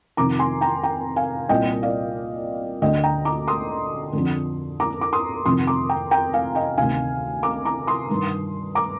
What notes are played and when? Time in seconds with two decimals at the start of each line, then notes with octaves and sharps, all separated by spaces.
0.17 F2 C3 D#3 A#5 D6
0.39 G#5 C6
0.61 G5 A#5
0.83 G5 A#5
1.16 F5 G#5
1.49 C2 A#2 D#5 G5
1.83 D5 F5
2.82 D2 D3 D#5 G5
3.04 G5 A#5
3.25 A#5 D6
3.48 C6 D#6
4.13 F2 D3
4.80 A#5 D6
5.01 D6
5.13 C6 D#6
5.45 F2 C3 D#3 C6 D#6
5.67 A#5 D6
5.89 G5 A#5
6.11 G5 A#5
6.33 F5 G#5
6.55 D#5 G5
6.77 D2 C3 D#3 F5 G#5
7.43 A#5 D6
7.65 A#5 D6
7.87 C6 D#6
8.09 G2 D#3
8.75 A#5 D6